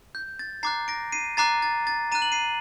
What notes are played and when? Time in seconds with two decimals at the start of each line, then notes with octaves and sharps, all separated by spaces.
0.15 G6
0.39 A6
0.63 A#5 D6 F#6 A6 C7
0.88 A#6 D7
1.12 C7 D#7
1.37 A#5 D6 F#6 A6 C7
1.62 A6
1.87 A6
2.12 A#5 F#6 D#7
2.22 F#7
2.32 C7 D#7